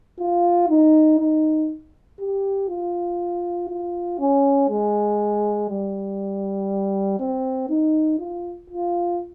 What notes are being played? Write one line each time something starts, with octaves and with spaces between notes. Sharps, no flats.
F4
D#4
D#4
G4
F4
F4
C#4
G#3
G3
C4
D#4
F4
F4